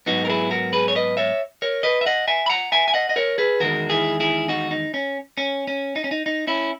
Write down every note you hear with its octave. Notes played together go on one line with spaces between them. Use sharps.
G#2 F#3 B3 D#4 F#4
A#4
E4 G#4
F#4 A#4
G#4 B4
C#5
B4 D#5
C#5 E5
A#4 C#5
B4 D#5
E5
D#5 F#5
E5 G#5
B5
F#5 A#5
E5 G#5
G#5
D#5 F#5
D#5
A#4 C#5
G#4 B4
E2 D#3 G#3 F#4 A#4
E4 G#4
E4 G#4
D#4 F#4
D#4
C#4
C#4
C#4
D#4
C#4
D#4
D#4
C#4 E4